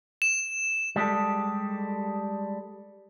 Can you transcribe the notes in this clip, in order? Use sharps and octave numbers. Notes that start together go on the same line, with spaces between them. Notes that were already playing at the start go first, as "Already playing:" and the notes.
E7
G3 G#3 G4 A4